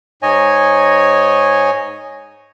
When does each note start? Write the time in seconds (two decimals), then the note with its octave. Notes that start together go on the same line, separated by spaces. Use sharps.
0.22 G#2 C#5 D#5 G#5